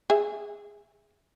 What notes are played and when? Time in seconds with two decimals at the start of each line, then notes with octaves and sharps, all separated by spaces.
0.10 G#4 E5